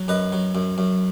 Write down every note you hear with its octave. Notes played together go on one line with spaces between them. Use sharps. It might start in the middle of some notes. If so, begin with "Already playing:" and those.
Already playing: F#3
F#2 B4 D#5
F#3
F#2
F#2